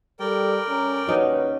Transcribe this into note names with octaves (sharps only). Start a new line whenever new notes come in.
G3 A4 A#4 D5 G5
C#4 A#5
D#2 C#4 D#4 F#4 B4 F#5